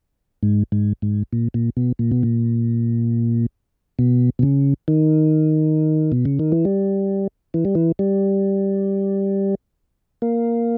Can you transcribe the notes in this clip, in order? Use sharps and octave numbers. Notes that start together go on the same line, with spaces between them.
G#2
G#2
G#2
A#2
A#2
B2
A#2
B2
A#2
B2
B2
C#3
D#3
B2
C#3
D#3
E3
G3
E3
G3
E3
G3
A#3